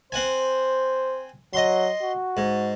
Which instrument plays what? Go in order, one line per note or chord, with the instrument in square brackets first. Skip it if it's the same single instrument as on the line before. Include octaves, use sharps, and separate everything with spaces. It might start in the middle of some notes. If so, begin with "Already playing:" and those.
[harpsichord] C4 F#5 G#5 [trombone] C5
[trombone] F#3 [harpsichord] D#5 C6
[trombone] F#4
[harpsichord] G#2